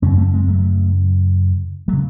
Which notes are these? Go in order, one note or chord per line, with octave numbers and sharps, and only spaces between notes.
F#2 C#3 A3 C#4
C4
A3 C#4
G#3 C4
F#3 A3
F#3 A3
C#3